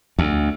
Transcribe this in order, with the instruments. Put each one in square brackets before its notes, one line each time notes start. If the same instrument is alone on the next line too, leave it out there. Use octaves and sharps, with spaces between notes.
[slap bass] D2